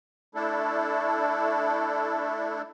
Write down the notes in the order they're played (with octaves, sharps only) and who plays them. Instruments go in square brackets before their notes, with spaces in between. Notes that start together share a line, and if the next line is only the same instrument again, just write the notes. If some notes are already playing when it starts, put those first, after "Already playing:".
[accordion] A3 D4 E4 A4